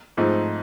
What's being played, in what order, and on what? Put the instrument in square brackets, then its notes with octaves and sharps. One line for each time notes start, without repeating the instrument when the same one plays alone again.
[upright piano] G#2 F3 A3 C4 D#4